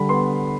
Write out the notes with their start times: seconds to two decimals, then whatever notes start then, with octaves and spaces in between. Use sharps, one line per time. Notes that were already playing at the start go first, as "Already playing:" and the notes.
Already playing: D3 G3 B5
0.09 B3 C6